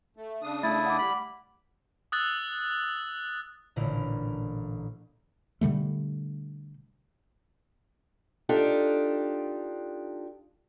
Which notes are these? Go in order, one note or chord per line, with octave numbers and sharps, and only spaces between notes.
A3
C#3 D4 D#6
A3 E4 E5 A6
F#5 D6
G3 B5
D#6 E6 F#6 A6 F#7
A1 A#2 D3 E4 A#4
B2 D3 G3 A3
D4 D#4 F4 G4 A4